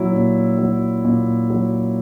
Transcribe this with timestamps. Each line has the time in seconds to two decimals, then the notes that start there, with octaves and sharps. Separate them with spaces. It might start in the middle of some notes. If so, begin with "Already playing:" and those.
Already playing: A#2 F#3 E4
0.13 A#2
0.58 F#3
1.04 A#2
1.50 F#3